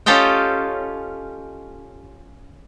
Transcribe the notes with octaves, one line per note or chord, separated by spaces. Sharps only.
C#4 F4 G4 A4 D#5 G5